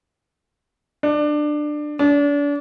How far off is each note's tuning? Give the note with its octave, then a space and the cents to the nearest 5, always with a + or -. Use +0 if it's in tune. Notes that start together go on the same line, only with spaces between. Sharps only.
D4 +20
D4 -35